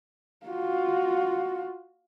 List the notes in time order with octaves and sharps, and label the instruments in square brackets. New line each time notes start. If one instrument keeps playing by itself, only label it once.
[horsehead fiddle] F4 F#4